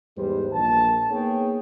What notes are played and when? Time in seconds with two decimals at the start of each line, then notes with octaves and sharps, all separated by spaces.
0.17 E2 G#2 G3 G#3 B4 C5
0.52 A#1 A5
1.10 A#3 B3 D#4 G#4 C#5 G5